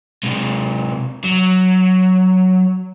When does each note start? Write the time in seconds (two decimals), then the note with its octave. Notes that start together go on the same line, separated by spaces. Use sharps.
0.23 C3 G#3
1.24 F#3